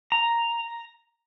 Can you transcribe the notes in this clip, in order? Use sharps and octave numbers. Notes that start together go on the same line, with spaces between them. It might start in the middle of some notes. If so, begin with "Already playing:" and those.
A#5